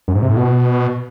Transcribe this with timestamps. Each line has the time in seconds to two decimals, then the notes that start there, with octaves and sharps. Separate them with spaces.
0.08 F#2
0.15 G#2
0.22 C3
0.30 A2
0.37 B2